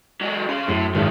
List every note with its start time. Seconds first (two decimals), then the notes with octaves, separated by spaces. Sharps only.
0.21 F#3 G#3
0.49 C#3 C#4 C6
0.68 F#2 A2
0.95 G#1 D#3 F3